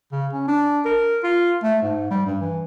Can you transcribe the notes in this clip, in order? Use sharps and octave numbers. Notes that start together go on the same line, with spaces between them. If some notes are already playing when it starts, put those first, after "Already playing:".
C#3
C#4
D4
A#4
F4
A3
G#2
G3
G2
E3